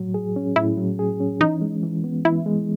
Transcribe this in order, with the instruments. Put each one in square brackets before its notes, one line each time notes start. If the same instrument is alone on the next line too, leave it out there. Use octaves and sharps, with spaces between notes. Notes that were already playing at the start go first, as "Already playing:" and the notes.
Already playing: [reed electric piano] A2 F#3
G#4
C#4
[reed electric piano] A2 [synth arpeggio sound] E4
[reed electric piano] F#3
G#4
C#4
[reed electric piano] E3 [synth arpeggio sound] D#4
[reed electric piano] G#3
E3
B3
[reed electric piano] E3 [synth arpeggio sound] E4
[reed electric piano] G#3